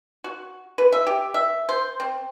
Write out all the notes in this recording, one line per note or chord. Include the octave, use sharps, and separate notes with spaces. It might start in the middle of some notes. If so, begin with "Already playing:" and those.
F#4
B4
E5
G4
E5
C5
C4